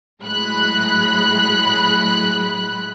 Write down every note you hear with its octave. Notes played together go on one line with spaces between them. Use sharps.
A2 F#3 G#3 B5 F#6